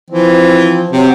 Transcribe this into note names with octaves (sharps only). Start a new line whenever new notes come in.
E3 F3 C4
C3 F#3 C4